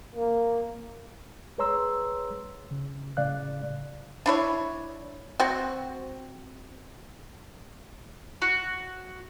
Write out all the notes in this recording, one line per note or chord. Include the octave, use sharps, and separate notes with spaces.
A#3
G#4 B4 C#5 A#5 C6 E6
C#3
A2 C#3 D5 F5 F#6
D4 E4 C#5
C4 F#4
F#4